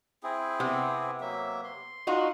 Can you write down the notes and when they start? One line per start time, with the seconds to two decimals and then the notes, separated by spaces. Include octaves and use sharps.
0.23 C4 E4 G#4
0.60 C3 B3
1.21 F#3 A#3 E5
1.64 C6
2.07 D#4 F4 F#4